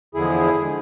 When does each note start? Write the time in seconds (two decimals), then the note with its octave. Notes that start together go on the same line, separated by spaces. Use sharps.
0.14 E2 D3 F3 G#3 E4 G#4
0.59 D3 F3 G#3